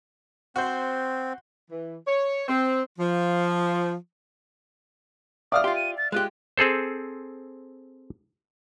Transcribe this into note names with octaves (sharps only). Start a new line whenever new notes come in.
C4 F#4 C5
E3
C#5
C4
F3
D5 E5 F5 D#6 F6
F4 G4 C6
D#7
A6
G#3 F4 G4 F#6
C4 G#4 A4 C5